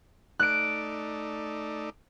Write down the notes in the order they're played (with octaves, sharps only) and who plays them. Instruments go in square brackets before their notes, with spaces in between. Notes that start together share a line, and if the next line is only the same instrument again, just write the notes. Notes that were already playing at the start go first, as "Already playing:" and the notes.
[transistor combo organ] A3 D#4 D5 [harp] F#6 D7